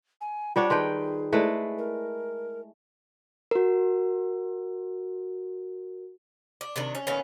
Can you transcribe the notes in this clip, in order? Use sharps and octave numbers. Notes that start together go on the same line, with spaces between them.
G#5
G3 D4 F4 C5 C#5 F#5
D#3 G#4 B4 G5 A5 C6
G#3 A3 E4 B4 C5 D5
A#4
F#4 A#4
D4
C3 D#3 D4
C#4
A#2 D#3 B3 C#4